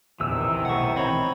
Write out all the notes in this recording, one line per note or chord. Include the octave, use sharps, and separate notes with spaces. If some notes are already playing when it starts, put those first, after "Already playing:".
A#1 E2 C3 D#3 E3 E6
B1 A3 F#5 C#6
C4 D#4 C#5 B5 C#6